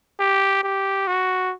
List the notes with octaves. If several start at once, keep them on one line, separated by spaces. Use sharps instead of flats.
G4
G4
F#4